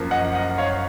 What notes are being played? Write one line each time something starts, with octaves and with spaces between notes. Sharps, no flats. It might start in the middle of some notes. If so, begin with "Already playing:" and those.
Already playing: F#2 F3 A#3
D#5 F#5
D#5 F#5
C#5 F5